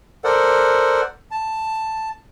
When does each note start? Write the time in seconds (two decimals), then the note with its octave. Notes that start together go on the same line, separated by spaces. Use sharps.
0.24 A4 A#4 C5 D5 F#5
1.31 A5